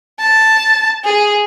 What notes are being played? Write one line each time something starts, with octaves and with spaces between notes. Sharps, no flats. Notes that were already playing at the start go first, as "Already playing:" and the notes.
A5
G#4